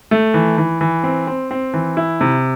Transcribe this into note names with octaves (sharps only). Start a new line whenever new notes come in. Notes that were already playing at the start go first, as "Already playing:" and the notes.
A3
E3
E3
E3
C4
C4
C4
E3
E4
C3